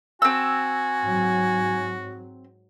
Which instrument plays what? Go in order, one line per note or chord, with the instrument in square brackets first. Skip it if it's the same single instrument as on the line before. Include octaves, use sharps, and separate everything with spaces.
[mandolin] C4 E6 [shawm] F#4 [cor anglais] G#5
[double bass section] G#2 F#3